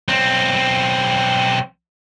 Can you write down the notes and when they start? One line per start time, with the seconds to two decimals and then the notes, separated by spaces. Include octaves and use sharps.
0.08 B1 C4